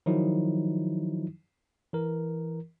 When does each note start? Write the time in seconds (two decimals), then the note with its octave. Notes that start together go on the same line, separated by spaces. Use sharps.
0.06 D#3 F3 F#3 D#4 E4
1.93 E3 A#4